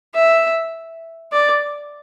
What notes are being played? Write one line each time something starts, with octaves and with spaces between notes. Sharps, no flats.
E5
D5